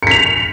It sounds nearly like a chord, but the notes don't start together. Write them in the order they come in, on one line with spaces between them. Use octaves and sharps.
C#7 B6 F7